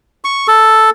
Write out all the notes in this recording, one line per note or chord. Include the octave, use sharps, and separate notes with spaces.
C#6
A4